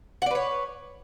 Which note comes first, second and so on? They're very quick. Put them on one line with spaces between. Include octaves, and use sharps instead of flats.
F#5 D5 B4 C#5